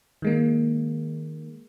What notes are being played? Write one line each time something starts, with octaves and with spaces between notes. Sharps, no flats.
D#3 G#3 A#3